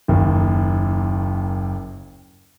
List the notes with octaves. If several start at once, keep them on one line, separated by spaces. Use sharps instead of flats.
F#1 D#2